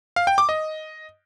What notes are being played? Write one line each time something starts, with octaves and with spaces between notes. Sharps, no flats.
F5
G5
D6
D#5